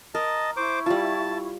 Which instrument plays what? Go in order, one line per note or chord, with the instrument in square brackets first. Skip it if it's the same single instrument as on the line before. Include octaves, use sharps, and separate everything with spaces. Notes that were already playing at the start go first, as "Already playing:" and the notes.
[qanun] A#4 [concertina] D#5 A5
[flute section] E4 C#6 [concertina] C5 D6
[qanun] G3 F4 [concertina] A5